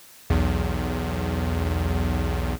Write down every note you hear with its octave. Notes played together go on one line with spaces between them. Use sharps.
B1 E2